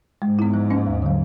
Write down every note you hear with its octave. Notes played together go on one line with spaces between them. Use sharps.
G#2 G#3
B3 E4
F3
A#3 C#4
D#2
D3 F#3